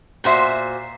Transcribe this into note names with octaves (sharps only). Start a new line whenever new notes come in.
A#2 F#4 C5 E5